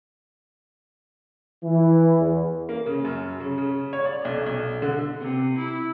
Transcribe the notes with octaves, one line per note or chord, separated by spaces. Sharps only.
E3
E2
A#3
C#3
F#2
C#3
C#3
C#5
D5
B1
B1
D3
C3
E4